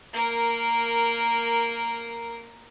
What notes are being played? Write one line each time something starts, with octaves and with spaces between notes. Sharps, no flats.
A#3 A#4